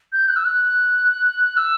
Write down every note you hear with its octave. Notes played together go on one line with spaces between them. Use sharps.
G6
F#6
E6
F#6
E6